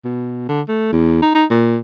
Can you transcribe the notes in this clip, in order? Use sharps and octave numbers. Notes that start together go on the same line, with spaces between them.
B2
D3
A3
E2
D#4
D#4
A#2